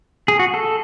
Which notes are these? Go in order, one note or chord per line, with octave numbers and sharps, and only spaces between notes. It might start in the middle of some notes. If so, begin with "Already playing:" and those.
G#4
F#4
A4